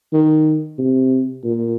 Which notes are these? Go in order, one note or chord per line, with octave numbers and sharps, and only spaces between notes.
D#3
C3
A#2